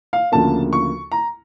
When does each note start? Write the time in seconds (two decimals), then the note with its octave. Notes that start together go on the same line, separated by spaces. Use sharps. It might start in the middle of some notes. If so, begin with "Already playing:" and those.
0.13 F5
0.32 D2 C#3 F3 A#3 A5
0.73 C#6
1.12 A#5